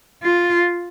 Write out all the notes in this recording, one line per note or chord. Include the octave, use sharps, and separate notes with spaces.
F4